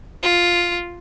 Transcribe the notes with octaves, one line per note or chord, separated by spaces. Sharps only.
F4